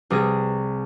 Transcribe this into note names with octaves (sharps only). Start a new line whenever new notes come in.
C2 G3 G#4 A#6